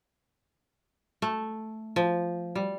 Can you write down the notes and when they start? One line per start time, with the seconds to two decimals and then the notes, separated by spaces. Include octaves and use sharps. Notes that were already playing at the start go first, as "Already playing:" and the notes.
1.22 A3
1.96 F3
2.55 G3